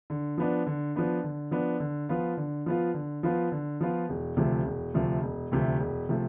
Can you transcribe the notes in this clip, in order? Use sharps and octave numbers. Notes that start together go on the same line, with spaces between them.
D3
F3 B3 D4
D3
F3 B3 D4
D3
F3 B3 D4
D3
F3 B3 F4
D3
F3 B3 F4
D3
F3 B3 F4
D3
F3 B3 F4
E1
D2 C3 F3 A3
E1
D2 C3 F3 A3
E1
D2 C3 F3 A3
E1
C3 F3 A3